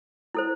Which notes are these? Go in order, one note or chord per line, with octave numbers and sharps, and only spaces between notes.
E4 A4 C5